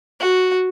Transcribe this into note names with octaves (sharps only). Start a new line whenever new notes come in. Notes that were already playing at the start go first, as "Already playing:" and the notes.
F#4